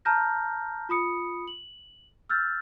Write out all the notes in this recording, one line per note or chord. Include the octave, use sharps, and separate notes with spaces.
A5 A#5 F6 G6 A#6
F4 B5 D#6 C#7
F#7
E6 F6 G6 A6